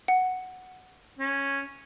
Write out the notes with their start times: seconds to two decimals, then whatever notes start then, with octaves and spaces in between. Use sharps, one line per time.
0.08 F#5
1.19 C#4